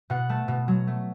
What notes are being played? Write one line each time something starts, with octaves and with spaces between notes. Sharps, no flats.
B2 F#5
A3 A5
B2
F#3
A3